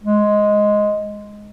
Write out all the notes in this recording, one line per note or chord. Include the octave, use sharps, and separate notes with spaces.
G#3